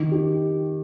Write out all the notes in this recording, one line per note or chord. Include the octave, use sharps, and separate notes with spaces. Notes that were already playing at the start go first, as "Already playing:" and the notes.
Already playing: D#3
G4